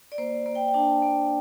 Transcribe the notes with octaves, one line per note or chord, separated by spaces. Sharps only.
D5
A#3 C5
A#3
G5
G5
D4 A5
A#3